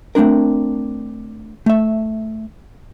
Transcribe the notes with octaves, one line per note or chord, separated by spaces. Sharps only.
A3 A#3 C4 D4 A#4
A3 E5